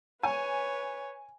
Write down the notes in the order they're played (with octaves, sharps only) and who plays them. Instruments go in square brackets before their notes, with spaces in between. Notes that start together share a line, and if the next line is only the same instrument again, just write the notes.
[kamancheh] B4 C#5 [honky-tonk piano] G#5